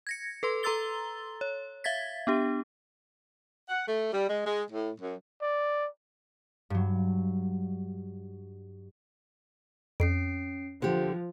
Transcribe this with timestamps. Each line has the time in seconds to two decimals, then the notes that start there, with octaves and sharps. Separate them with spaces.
0.07 G#6 A#6 C#7
0.43 A4 B4 C6
0.63 A4 A#5 C6 E6 A6 G7
1.41 C#5
1.84 E5 F5 G#6 A6 B6
2.27 B3 D4 G4
3.69 F#5
3.88 A3
4.12 G3
4.28 G#3
4.46 G#3
4.70 A2
5.01 F#2
5.42 D5
6.70 G2 F#3
10.00 F2 C#4 C7 D7
10.82 D3 F3 G4 C5